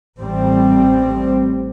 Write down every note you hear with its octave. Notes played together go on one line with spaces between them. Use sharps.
A1 A2 G3 C4